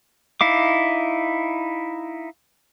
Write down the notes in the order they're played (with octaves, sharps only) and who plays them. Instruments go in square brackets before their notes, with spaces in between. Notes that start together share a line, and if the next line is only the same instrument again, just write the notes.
[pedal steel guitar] D#4 E4 F5 D6